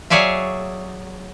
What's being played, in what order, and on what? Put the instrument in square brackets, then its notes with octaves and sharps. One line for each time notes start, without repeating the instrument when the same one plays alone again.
[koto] F#3 G#4 C#5 D5 E5 F5